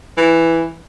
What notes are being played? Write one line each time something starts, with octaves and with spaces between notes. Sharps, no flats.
E3